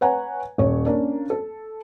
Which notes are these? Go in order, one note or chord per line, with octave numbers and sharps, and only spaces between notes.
B4 C#5 F#5 G#5 A#5
D#1 C#5
A#3 C#4 D4
A4